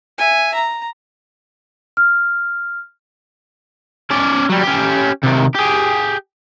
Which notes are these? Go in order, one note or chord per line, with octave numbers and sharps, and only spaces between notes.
E5 G#5
A#5
F6
C#4 D5
F#3 G3
C#4 G4
C3 D#3
G4 G#4